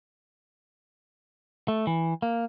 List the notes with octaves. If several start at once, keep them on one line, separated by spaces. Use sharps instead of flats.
A3
E3
A#3